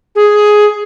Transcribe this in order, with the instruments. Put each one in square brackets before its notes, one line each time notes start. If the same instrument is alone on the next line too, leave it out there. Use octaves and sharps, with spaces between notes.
[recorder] G#4